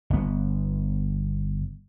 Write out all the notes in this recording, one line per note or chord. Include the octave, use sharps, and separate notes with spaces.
G1 B3